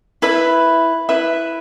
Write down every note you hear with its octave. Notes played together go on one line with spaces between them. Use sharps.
E4 B4 E5
E4 B4 E5